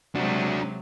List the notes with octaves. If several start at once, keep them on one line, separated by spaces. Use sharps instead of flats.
C3 F#3 G#3 D4 F#4